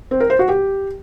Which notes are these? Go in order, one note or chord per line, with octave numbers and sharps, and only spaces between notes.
C4
A#4
C5
F#4
G4